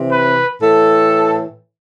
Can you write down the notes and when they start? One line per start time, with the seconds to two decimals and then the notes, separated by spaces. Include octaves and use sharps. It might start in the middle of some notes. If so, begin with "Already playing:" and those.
Already playing: C3 E3
0.10 B4
0.62 A2 E3 A4